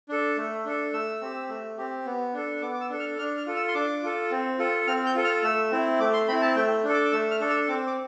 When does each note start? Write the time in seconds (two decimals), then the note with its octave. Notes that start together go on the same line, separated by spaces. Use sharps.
0.09 D4 A4
0.37 A3
0.65 D4 A4
0.93 A3 E6
1.22 C4 G4
1.49 A3
1.78 C4 G4
2.06 B3
2.34 D4 A4
2.62 B3 D6
2.74 D6
2.81 E6
2.90 D4 A4
3.00 F6
3.18 D4 F6
3.37 F6
3.46 F4 A4
3.56 E6
3.68 C6
3.75 D4 D6
4.03 F4 A4
4.31 C4
4.59 F4 A4
4.87 C4 F6
5.06 G6
5.15 F4 A4
5.24 F6
5.43 A3 E6
5.71 C4 E4
6.00 A3 D6
6.14 C6
6.28 C4 B5
6.32 E4
6.42 A5
6.56 A3 G5
6.84 D4 A4
6.94 D6
7.05 D6
7.12 A3 E6
7.31 F6
7.40 D4 A4
7.50 E6
7.69 C4 D6
7.87 D6